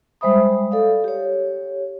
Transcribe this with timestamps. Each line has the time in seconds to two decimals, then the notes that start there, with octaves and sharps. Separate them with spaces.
0.21 G3 G#3 C5 E5 B5 D#6
0.72 A4 D5 F5
1.04 G4 C#5